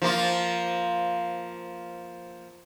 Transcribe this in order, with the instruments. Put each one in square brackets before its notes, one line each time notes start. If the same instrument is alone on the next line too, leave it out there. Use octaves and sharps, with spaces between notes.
[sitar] F3 A#3 F4